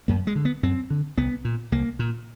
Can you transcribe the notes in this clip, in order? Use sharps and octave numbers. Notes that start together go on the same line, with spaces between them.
F#2 A#3
G#3
D3
B3
F#2 C4
D3
C2 B3
A#2
C2 A#3
A#2